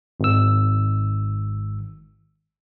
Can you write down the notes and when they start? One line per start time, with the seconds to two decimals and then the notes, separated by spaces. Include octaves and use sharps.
0.20 G#1 E6